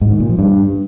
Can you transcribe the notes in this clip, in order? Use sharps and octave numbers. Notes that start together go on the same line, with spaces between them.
G#2
D#3
A#2
F3
G2